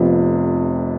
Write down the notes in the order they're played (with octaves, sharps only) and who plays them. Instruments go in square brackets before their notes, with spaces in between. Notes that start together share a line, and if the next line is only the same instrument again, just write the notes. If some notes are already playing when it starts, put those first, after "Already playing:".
Already playing: [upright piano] F1 F2 C3 F3 B3